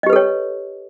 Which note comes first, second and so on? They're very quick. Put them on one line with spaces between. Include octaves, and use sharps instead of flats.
D#5 G4 B4 A4 C#5